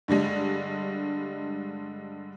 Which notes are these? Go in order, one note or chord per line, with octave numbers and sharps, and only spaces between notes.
G2 D3 G3 G#3